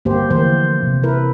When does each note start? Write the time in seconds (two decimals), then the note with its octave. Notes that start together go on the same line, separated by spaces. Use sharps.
0.05 G1 A#3 G4 C5
0.31 D3 E3 F3 A3 A#3 C5
0.83 C3
1.03 E4 A#4 B4